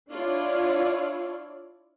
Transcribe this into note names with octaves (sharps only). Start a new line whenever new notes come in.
D4 E4 F4 C#5 D5